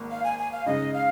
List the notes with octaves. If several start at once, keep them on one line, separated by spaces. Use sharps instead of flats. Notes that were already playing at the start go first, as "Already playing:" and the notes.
Already playing: G#1 G#2 A#3
F5
G#5
G#5
F5
C#3 G#3 D#4 D#5
F5